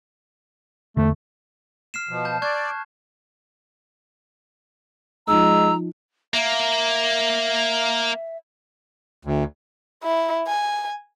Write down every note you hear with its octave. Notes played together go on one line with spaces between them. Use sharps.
E2 D3 A3
F6 C7 E7
B2 F3
A5 G6
D5 C#6 F#6 G#6
F3 G#3 D#4 A#5 E6
A#3 E5
D2
E4
G#5